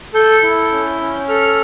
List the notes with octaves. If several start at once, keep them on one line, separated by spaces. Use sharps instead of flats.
A4 G6
E4
C#4
C#4
A4 F6